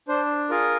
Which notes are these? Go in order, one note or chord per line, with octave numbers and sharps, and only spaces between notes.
D4 C5
F4 G#4 A#4